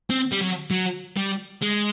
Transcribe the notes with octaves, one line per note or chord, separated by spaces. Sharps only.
C4
G3
F#3
F#3
G3
G#3